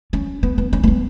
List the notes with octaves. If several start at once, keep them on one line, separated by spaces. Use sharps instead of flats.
C#4
B3
B3
C#4
A#3
B3